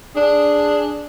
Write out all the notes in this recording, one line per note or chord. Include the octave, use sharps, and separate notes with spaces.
D4 G#4